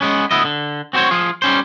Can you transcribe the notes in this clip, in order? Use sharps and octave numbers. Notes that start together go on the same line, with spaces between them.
G#3 B3 C#4
D2 B3 E4 D#5
D3
C4 F#4 G#4 C5 C#5
F3 F4 G#4
G3 C#4 C5